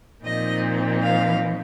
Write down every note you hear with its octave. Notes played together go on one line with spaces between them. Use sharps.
A#2 F3 C4 D#4 D#5
F5